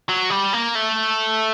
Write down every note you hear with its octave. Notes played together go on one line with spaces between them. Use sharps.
F#3
G3
A#3
A3